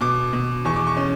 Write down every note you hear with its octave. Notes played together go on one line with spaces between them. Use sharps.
B2 D6
B2
E2 C#6
D6
C#6
C#4